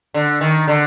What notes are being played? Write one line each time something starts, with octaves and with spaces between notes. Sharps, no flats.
D3
D#3
D3